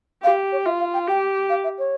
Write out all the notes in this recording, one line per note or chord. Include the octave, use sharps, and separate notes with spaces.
G4 F5
C#5
F4 E5
F5
G5
G4 G5
F5
E5
C#5